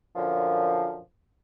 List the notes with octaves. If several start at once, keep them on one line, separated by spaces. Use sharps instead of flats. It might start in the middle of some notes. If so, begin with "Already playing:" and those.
F#2 A#2 D3 F3